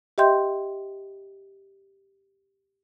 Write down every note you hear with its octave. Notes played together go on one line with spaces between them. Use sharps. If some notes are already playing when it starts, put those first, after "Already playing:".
G4 D#5 E5 G5 C6 G6